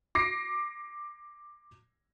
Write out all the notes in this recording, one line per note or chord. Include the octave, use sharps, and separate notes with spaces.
D6 A#6 C7 D7